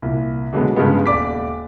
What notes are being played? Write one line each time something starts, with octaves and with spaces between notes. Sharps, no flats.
C2 A#2
B2 D3 F#3 G#3 B3
G2 C#3 F3 G#3 B3
D#1 D5 D6 B6